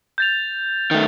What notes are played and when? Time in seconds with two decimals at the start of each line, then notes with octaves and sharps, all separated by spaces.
0.18 G6 A6 F7
0.91 D#3 A3